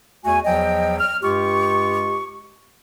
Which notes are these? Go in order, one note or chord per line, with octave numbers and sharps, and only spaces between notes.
E2 A3 F#4 G#5
E2 F3 F#3 D#5 G5
F6
G2 G#3 F4 G4 C#6